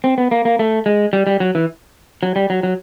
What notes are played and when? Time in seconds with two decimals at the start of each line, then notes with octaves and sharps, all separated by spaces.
0.04 C4
0.18 B3
0.31 A#3
0.45 A#3
0.59 A3
0.86 G#3
1.13 G3
1.27 G3
1.40 F#3
1.55 E3
2.23 F#3
2.36 G3
2.50 F#3
2.63 F#3